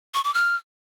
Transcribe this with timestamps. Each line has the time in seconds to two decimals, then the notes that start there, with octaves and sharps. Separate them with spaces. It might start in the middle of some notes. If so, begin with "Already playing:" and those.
0.14 C#6
0.24 D6
0.34 F6